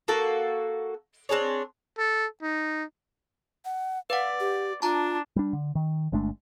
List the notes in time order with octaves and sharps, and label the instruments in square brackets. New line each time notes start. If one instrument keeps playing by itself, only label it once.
[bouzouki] A#3 F#4 A4
C4 D4 G#4 C#5
[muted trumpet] A4
D#4
[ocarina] F#5
[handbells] B4 F#5 [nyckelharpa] D5 [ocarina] F5
[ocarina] G4
[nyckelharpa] D4 [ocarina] F4 [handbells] A5 A#5
[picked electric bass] G3 D4
D3
D#3
G1 G#3 A3 D4